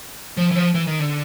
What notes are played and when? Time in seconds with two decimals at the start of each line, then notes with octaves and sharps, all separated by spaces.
0.37 F3
0.51 E3
0.56 F3
0.74 E3
0.87 D#3
0.99 D3